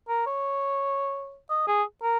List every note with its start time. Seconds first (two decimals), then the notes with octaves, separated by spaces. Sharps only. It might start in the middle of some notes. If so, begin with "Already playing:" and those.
0.09 A#4
0.26 C#5
1.50 D#5
1.67 G#4
2.03 A#4